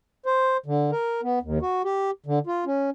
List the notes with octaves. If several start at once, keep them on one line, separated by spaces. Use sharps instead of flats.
C5
D3
A#4
B3
D#2
F#4
G4
D3
F4
C#4